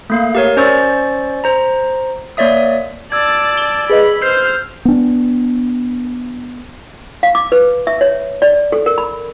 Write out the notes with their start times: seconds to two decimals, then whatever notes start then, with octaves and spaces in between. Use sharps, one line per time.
0.10 A3 A#3 F5
0.35 G4 A#4 C#5
0.57 C#4 C5 D5 C#6 E6 A6
1.44 C5 A#5
2.37 A#3 C#5 D5 E5 D#6
3.12 D5 A5 E6 G#6
3.58 G7
3.90 G#4 B4 D#5 B5
4.22 C5 F6 G6 C7
4.85 B3 D4
7.23 F5
7.35 D6
7.52 B4
7.87 E5
8.01 C#5
8.42 D5
8.72 A4
8.86 A#4
8.98 B5